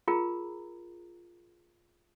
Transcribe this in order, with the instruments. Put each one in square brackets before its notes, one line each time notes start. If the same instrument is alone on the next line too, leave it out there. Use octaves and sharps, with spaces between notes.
[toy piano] F4 G#4 A#4 A#5